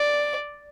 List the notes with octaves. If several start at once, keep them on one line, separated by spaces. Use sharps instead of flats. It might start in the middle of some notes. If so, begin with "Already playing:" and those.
Already playing: D5